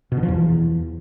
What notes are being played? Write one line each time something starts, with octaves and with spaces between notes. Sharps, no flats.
B2
D3
F3
E2